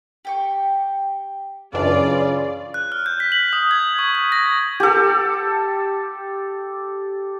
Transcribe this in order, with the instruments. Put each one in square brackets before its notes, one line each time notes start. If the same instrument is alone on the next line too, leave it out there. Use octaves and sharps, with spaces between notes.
[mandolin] G4 G5 C#6
[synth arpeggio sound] F#2 E3 D4 [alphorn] C#3 [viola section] F4 D5
[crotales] F#6
F6
G6
B6
F#7
D#6
G#6
C#6
G#6
A#6
[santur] G4 A4